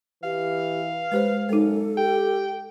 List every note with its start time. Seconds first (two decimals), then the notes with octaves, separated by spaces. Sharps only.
0.24 E3 G4 F5
1.12 G#3 G4 B4 C5
1.49 F#2 G#3 D#4 A4
1.97 G4 G5